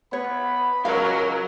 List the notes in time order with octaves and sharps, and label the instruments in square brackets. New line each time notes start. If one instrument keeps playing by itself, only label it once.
[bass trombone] B3 [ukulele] C#5 [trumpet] B5
[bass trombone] C#2 [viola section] F#3 A#4 [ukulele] F5